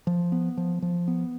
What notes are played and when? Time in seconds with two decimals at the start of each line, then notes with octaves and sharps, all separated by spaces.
0.07 F3
0.32 B3
0.57 F3
0.82 F3
1.08 B3